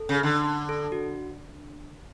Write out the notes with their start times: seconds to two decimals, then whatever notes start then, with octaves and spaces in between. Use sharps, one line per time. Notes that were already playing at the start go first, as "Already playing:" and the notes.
Already playing: A4
0.09 C#3
0.23 D3
0.69 A4
0.92 F#4